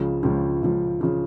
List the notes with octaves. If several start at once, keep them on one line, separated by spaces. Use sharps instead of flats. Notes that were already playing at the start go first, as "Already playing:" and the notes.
Already playing: C#2 C#3 F3
C#2 C#3 F3
C#2 C#3 F3
C#3 F3